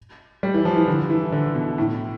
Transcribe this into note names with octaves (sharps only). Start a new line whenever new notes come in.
G3
E3
F3
E3
D3
E3
D3
B2
A2